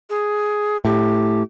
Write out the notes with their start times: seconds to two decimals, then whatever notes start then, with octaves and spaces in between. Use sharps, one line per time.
0.10 G#4
0.85 A2 G4